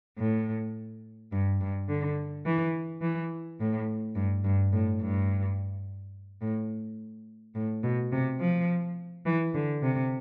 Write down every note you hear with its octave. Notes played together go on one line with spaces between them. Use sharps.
A2
G2
G2
D3
E3
E3
A2
G2
G2
A2
G2
A2
A2
B2
C3
F3
E3
D3
C3